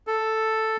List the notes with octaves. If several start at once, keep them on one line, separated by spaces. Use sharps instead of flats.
A4